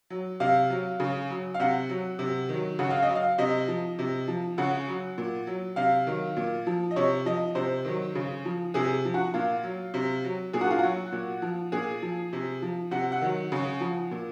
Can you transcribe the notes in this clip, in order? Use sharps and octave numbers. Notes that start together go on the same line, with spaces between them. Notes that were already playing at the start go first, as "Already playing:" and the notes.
F#3
C3 F5
F#3
C#3
F#3
F5
C3 F#5
F#3
C3
D#3 F#3
C#3 F#5
F5
D#5
F#3
F5
C3 D#5
F3
C3
F3
C#3 F#5
F#3
A#2
F#3
C3 F5
D#3 F#3
A#2
F3
D#5
C3 C#5
F3 D#5
C3 C5
D#3 F#3
C#3
F3
C3 G#4
F3
F#4
A#2 F4
F#3
C3
F#3
A#2 G#4
F#4
F4
F#3 F#4
A#2
F3
A#2 G#4
F3
C3
F3
C3 F#5
F#5
D#3 F#3
C#3
F3
A#2